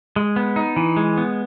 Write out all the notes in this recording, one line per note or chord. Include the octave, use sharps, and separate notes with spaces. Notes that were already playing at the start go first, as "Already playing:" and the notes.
G#3
B3
D#4
E3
G#3
B3